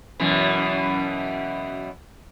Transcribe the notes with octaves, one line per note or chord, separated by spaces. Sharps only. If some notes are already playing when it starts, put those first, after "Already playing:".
F#2 B2 E3